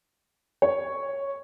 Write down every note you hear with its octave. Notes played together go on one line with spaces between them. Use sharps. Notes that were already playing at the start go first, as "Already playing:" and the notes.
C#5